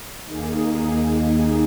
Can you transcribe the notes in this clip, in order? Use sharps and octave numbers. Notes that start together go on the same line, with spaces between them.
D#2 D#3 A#3 D#4 G#4